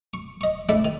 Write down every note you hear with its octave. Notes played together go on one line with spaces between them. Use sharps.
C#6
D#5 C#6
G#3 A3 D4 E4
D#3